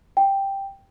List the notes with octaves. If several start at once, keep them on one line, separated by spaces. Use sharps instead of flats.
G5